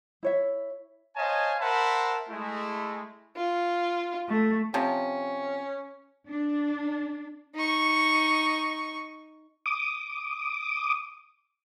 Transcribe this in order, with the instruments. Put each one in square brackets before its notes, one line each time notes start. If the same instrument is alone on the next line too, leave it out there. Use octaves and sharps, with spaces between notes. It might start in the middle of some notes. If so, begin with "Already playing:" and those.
[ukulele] E4 C#5 E5
[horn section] C5 C#5 D#5 F5 G#5 A5
A#4 C5 E5 F#5 A5 B5
G#3 A3 E4
[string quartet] F4
A3
[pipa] C3 F3 [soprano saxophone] C#4
[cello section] D4
[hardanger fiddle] D#4 C#6
[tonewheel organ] D6 D#6